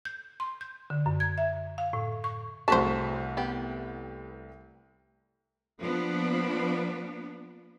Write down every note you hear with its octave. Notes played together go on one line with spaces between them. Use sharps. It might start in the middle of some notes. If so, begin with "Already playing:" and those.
G6
C6
G6
D3
F#2
G#6
E5
F5
A2
C#6
C2 A2 F#4 G#4 B4 C5 A5 B6
B3 G4
F3 A#3 B3 D4